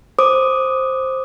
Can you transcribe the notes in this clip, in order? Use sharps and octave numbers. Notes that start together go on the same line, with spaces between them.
C5 D6 D#6